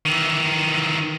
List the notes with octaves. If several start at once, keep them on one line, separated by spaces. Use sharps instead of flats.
D#3 E3